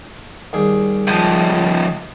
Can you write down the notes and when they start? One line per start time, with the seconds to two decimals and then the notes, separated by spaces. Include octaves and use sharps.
0.53 D#2 G3 G#4
1.07 C#2 F3